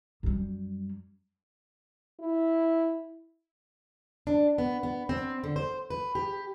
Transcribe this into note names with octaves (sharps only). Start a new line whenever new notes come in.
F#2 G3
E4
D4
B3
B3
C4
D3
C5
B4
G4